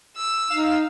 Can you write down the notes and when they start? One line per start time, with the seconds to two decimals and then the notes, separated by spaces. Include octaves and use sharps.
0.16 E6
0.50 D#4 F5